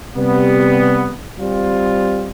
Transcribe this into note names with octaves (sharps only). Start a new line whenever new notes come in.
C3 G3 B3
G3 C4 F4